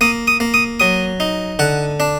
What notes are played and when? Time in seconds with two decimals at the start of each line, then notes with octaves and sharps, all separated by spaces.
0.01 A#3 D#6
0.27 D#6
0.40 A#3
0.54 D#6
0.80 F#3 D#6
1.20 D#4
1.59 D3 F#5
2.00 D4